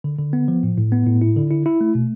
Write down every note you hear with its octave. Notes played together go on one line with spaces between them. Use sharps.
D3
D3
B3
F3
A2
A2
B3
A2
E4
D3
E4
E4
A3
B2